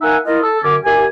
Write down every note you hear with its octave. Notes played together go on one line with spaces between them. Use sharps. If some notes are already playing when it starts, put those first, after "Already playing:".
A#3 D#4 E5 F#5 G#5
A#3 E4 F4 D#5
A4
F#2 D3 C#4 D6
D#2 G4 G#5